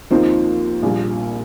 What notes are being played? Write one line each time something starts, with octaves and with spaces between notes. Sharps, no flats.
D#2 D#3 F3 C4 D#4
A#1 A#2 G3